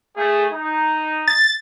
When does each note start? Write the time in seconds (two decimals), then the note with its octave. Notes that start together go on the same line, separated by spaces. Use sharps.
0.17 A3 G#4
0.52 D#4
1.28 A6